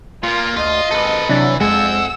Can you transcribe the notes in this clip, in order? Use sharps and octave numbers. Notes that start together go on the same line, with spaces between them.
A#2 A#3 F4
D2 F4 D#5
G#1 A4 B4
C3 E3 F#3 D4 A6
F2 G#3 F#5 G#5 E6